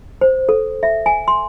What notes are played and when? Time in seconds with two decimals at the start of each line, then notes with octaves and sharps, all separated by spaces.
0.21 C5
0.49 A4
0.83 E5
1.06 G#5
1.28 C6